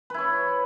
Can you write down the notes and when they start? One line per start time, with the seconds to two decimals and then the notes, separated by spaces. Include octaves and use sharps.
0.10 B4
0.14 E4
0.18 C#5